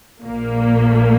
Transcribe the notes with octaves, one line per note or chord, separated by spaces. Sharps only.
A#1 A#2 A#3